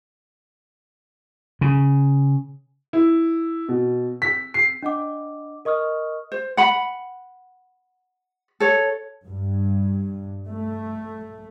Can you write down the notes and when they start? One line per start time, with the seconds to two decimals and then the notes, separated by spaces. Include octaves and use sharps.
1.61 C#3
2.93 E4
3.69 B2
4.22 B6
4.54 C7
4.83 D4 D#5 F#5 D6
5.65 A#4 D#5 C#6 D#6 F6
6.32 C5
6.57 F#5 B5
8.60 A4 C#5
9.26 G2
10.47 A3